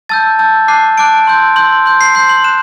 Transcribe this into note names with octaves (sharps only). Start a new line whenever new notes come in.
A5 E6 G6 A6
A5 E6 G6
A5 D6 F#6 C7
A5 D6 F#6 D7
C6 E6 G6
C6 E6 G6 F#7
C6 G6
C7
C6 G6 C7
F#7
F#6 E7